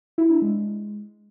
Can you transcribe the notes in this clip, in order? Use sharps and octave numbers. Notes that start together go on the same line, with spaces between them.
E4
D4
G#3